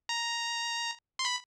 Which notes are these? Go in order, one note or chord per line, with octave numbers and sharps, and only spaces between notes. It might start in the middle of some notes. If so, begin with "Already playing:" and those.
A#5
C6
B5